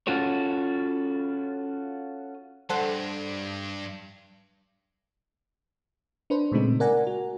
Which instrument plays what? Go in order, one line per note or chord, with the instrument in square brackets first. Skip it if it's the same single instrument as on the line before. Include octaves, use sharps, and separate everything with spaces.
[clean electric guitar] C#4 F4 F#4 A4 C#5
[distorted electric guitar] G2 [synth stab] A4 C5 F#5
[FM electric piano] D4 B4 C5
A#2 C#3 G#3 A3 C4 D#4
A#4 D5 F#5 G#5 A#5
F#4